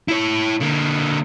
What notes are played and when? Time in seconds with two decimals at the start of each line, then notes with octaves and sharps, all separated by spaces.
0.08 E4 C#5
0.61 D3 A#3